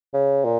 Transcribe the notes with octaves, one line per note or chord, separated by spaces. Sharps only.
C#3
A#2